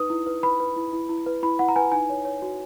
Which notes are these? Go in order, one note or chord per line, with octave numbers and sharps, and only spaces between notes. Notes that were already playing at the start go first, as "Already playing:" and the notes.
Already playing: D#4 B4 D#6
E4
B4
B4 B5
B4
E4
E4
E4
B4
E4 B5
E4 F#5
A#5
B4 G#5
D#4 G#5
C#5
C#5
F#4